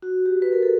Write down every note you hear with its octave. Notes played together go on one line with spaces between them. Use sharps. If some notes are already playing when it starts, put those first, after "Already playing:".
F#4
G4
B4
A#4
A4